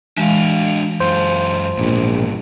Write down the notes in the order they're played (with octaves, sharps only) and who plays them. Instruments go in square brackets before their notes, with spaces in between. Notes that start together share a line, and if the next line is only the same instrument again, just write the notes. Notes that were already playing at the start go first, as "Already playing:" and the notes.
[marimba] E3 G#3 [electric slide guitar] D4 F#4 F5
[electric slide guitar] F#2 F4 [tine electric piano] C5
[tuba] A#1 [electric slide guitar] G#2 B2